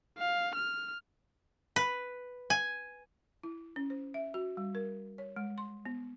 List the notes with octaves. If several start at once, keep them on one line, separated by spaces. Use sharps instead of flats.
F5
F6
B4
G#5
E4
C#4
C5
E5
F#4
G3
A#4
C#5
G#3
C6
B3